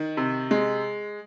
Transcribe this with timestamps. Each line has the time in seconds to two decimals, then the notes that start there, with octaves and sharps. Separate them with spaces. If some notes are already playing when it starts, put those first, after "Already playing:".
Already playing: D#3
0.17 C3
0.51 G#3